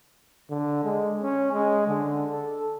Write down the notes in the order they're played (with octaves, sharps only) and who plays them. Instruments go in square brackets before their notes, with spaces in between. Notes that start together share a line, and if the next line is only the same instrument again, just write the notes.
[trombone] D3
G#3
C#4
G#3
D3
A4